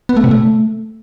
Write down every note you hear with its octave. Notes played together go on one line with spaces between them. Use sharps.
B3
A3
C3
A3